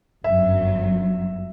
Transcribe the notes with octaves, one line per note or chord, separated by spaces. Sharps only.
G1 F#2 F#3 E5